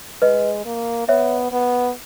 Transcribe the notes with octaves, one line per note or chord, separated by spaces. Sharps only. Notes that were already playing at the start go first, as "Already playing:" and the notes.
G#3 B4 D#5
A#3
B3 C#5 E5
B3